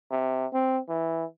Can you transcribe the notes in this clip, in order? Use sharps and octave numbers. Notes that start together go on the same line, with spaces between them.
C3
C4
E3